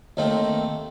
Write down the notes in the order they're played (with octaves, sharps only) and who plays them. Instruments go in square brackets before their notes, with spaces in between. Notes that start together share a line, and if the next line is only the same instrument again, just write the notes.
[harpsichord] D#2 D#3 A3 C4